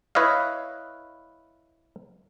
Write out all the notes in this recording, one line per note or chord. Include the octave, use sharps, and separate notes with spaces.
E4 B4 C#5 D#5 F5